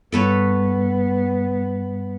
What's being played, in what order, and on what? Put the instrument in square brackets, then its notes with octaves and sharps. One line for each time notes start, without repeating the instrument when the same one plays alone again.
[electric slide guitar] G2 [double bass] B3 [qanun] A4 B4 C#5